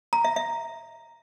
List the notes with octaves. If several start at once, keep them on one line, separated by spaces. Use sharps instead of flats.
A#5
E5
E5